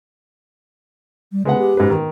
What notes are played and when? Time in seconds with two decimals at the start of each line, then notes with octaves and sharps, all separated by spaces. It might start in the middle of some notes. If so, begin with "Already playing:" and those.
1.32 G3
1.45 C#3 G#3 B3 F#5
1.58 G4
1.77 G#2 B4
1.90 D#3